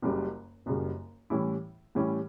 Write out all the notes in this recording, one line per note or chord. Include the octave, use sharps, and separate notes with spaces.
F#1 F#2 C#3 G3
F#1 F#2 C#3 G3
A2 E3 G3 C#4 E4
A2 E3 G3 C#4 E4